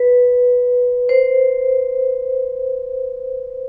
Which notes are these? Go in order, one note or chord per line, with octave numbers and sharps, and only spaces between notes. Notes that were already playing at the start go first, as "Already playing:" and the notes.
Already playing: B4
C5